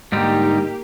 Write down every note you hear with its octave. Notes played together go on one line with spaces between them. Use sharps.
G#2 D3 G3 A#3 D#4 G4